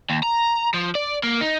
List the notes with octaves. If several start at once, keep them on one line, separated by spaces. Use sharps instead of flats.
D#2
A#5
F3
D5
A#3
D#4